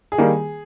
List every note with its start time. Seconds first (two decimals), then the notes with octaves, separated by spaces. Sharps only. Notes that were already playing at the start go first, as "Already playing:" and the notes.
0.12 G#4
0.18 D#3 G3 A#3